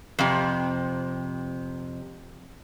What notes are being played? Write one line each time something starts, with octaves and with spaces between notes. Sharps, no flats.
F2 C3